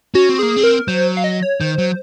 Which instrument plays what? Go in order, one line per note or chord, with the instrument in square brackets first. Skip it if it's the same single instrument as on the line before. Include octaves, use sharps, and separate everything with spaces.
[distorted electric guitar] C#4 [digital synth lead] F#4
[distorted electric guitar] C4
[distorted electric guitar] A#3 [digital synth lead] G#4
[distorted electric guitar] C4
[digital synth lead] A#4
[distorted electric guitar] F#3 [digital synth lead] C5
[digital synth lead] F5
D#5
C#5
[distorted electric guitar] D#3 [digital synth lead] C5
[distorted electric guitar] F#3